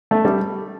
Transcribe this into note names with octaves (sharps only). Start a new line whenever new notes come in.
A3
G3